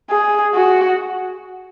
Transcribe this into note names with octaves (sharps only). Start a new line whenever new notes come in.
G#4
F#4